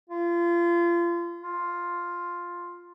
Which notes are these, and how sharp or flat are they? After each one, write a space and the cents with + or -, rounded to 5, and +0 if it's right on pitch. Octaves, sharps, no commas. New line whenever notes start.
F4 -30
F4 +5